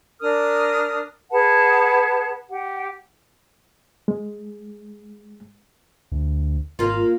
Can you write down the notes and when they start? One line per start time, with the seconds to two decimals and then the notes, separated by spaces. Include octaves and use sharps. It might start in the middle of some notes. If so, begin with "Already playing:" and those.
0.21 D4 A#4 D#6 F6
1.31 G#4 B4 F#5 A5
2.50 G4 F#5
4.08 G#3
6.12 D2
6.79 G#1 A#3 F4